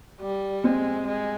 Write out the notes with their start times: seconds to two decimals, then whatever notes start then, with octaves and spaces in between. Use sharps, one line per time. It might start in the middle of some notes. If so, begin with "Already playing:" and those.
0.20 G3
0.64 G#3 C4
1.07 G#3